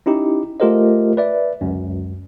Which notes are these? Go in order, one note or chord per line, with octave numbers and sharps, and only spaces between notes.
C#4 D#4 E4 G4
A3 F4 G4 A#4 C5 D#5
B4 D5 E5
G1 C#2 F#2